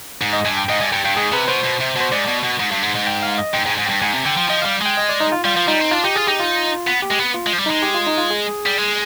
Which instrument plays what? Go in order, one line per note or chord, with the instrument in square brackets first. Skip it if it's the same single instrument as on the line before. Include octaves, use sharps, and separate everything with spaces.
[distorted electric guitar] G#2
[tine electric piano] D#5
[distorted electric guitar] G2 [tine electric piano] G#5
[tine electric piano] G5
[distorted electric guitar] G#2 [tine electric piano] D#5
[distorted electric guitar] G2 [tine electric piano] G#5
[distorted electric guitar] G2 [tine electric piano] G5
[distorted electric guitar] G2 [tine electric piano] G5
[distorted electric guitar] G#2 [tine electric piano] G#4
[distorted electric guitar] C3 [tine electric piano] B4
[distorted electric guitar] B2 [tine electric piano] C5
[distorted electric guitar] B2
C3
[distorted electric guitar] B2 [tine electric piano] C5
[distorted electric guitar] G#2 [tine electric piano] D5
[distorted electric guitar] B2
B2
G#2
G2
G#2
G#2
[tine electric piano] G5
F5
D#5
[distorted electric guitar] G#2 [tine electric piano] G5
[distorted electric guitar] G#2
[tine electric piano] G#5
[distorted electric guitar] G#2
[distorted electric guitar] G2 [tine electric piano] G5
[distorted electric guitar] G#2 [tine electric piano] G#5
[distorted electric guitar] C3
[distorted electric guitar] D3 [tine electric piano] G5
[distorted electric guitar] F3
[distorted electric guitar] F3 [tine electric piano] D#5
[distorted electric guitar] G3 [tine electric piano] F5
[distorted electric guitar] G#3 [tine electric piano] G5
[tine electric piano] D#5
D5
D#4
F4
[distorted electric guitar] G3 [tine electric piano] F4
[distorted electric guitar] F3
[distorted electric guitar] G3 [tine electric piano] D#4
[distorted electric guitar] C4
[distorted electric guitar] D4 [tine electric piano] F4
[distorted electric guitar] D#4 [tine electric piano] G4
[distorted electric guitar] F4 [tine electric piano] G#4
[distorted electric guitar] D#4 [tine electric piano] G4
[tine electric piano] F4
[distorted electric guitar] B3
[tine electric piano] G4
[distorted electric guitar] G#3
B3
[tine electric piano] F4
[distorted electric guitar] G#3
F3
G3
[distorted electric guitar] G#3 [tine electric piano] D#4
[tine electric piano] G4
F4
D#4
F4
G#4
[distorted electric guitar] G3
G#3